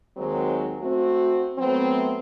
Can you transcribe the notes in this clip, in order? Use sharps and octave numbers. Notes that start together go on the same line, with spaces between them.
D#2 D#3 F#3 G#3 C4
A3 C4 F#4
F#3 A3 B3 C4